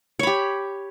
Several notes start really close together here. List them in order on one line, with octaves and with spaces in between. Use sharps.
C#5 B5 G4